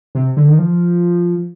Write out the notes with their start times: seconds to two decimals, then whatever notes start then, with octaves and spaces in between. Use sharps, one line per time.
0.15 C3
0.37 D3
0.48 D#3
0.58 F3